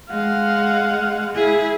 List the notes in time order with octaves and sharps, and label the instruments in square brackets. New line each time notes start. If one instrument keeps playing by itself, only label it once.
[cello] G#3 [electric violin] F5 F#5
[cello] E4 G#4